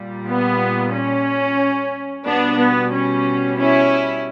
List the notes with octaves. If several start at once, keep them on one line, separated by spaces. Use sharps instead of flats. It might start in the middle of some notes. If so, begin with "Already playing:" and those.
Already playing: A#2 G3
B3
C#4
B2 G3 B3 D4
B3
C#4
C#4 E4